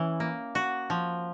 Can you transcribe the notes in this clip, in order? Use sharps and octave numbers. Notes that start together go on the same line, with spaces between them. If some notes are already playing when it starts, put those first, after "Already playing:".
Already playing: E3 C#4
A#3
F#4
F3